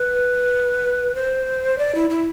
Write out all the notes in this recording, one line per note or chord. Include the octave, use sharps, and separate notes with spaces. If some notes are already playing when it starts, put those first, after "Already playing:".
Already playing: B4
C5
D5
E4
E4